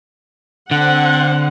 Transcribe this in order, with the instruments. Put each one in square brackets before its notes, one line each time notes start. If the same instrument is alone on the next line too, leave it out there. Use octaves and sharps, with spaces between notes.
[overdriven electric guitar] D3 [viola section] C4 F#5